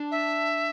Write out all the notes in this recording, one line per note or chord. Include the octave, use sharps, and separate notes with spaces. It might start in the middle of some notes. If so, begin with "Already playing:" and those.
Already playing: D4
E5